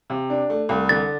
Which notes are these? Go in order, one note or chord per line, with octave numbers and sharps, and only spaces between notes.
C3
D4
A3
C2
D3 A6